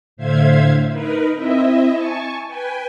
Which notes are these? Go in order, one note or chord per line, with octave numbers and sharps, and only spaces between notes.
A2 D3 C5 E5 F5 G#6
D#4 A#4 B4
C4 E4 D#5 E5
G#5 A5 C#6
B4 G5 G#5